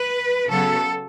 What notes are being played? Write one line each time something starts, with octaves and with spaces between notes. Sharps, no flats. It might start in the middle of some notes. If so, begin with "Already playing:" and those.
Already playing: B4
C#3 F#3 B3 A4